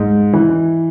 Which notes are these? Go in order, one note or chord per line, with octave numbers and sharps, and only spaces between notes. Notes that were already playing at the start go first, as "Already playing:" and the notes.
Already playing: G#2
E3